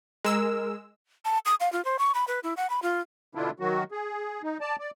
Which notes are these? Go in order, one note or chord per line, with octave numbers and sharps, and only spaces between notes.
G#3 A#4 E6
A5
D#6
F5
F4
C5
C#6
B5
B4
E4
F#5
B5
F4
B2 D3 D4 E4 F4
D#3 F#3 F#4
G#4
D#4
D5 A5
D5